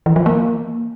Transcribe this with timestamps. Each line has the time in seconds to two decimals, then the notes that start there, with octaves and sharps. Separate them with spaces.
0.06 E3
0.16 F3
0.26 A#3